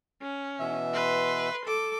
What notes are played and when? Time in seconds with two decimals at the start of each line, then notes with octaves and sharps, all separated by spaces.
0.22 C#4
0.59 B2 E3 E5
0.94 B4 C6
1.65 A4 D6